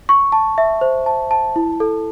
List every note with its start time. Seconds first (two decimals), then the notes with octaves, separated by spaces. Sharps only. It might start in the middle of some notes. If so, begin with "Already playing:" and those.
0.09 C#6
0.32 A5
0.58 E5
0.81 C5
1.06 A5
1.31 A5
1.56 E4
1.80 A4